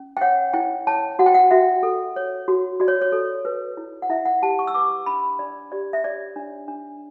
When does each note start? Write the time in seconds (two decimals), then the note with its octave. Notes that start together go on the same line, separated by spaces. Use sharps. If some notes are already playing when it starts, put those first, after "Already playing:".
Already playing: C#4
0.17 G5
0.21 C#5 F#5
0.54 E4 G5
0.87 C#5 A5
1.19 F#4 F#5
1.26 G5
1.34 F#5
1.51 F#4 E5
1.83 A4
2.16 C#5
2.48 F#4
2.80 F#4 D5
2.88 C#5
3.02 C#5
3.12 A4
3.45 B4
3.77 E4
4.02 F#5
4.10 E4 E5
4.25 F#5
4.42 G4 A5
4.59 C#6
4.67 E6
4.74 B4 D6
5.06 D4 B5
5.39 D4 D5
5.72 G4 D5
5.93 E5
6.04 C#5 D5
6.36 D4
6.68 D4